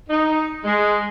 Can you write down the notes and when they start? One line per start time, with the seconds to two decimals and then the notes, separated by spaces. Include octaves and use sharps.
0.09 D#4
0.64 G#3